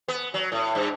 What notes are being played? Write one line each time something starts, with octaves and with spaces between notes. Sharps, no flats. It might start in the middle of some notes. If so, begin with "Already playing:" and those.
B3
F#3
A2
G2